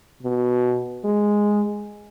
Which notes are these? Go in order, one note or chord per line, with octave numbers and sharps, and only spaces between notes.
B2
G#3